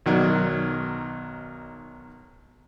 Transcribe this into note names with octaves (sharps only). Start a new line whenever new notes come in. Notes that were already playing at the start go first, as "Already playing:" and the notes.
B1 D#3 F#3 D5